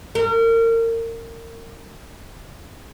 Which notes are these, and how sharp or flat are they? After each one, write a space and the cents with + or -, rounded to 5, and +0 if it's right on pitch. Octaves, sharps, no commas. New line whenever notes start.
A#4 -30